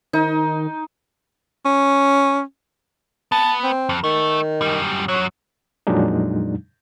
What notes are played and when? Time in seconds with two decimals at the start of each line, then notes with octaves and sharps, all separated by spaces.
0.13 D#3 D#4
1.65 C#4
3.32 B3 A5
3.64 C4
3.89 F2
4.04 D#3 A3
4.62 F#2 G3
5.09 F#2 F#3 C#5
5.87 F2 A#2 F#3 G#3 D4 D#4